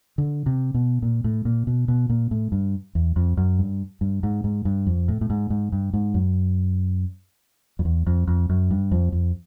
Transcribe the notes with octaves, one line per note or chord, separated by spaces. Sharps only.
D3
C3
B2
A#2
A2
A#2
B2
B2
A#2
A2
G2
E2
F2
F#2
G2
G2
G#2
G#2
G2
F2
A2
A2
G#2
G#2
G2
G#2
F#2
F2
E2
F2
F2
F#2
G2
F2
F2